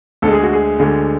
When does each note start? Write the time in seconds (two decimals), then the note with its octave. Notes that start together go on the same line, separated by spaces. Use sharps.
0.22 D2 D3 G#3 A4
0.33 G#4
0.43 F#4
0.53 G#4
0.79 D2 D3 G#3